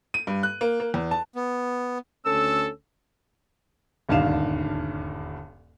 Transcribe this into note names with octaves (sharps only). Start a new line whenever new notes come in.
D#7
G2
F#6
A#3
A#3
E2
A5
B3
D2 C#4 A4 E6
D#1 D2 G2 D#3 F5 E7